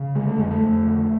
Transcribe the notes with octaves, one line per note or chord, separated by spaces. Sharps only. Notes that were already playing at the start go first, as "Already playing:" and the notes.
Already playing: C#3
D3 G#3
A3
F2 G#3
A3
F2
D3